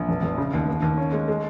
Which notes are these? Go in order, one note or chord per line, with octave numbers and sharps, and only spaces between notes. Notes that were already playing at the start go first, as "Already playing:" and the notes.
Already playing: A#1
F1
F1
C#3
D#2
D#2
D#2
C#4
G#3
G#3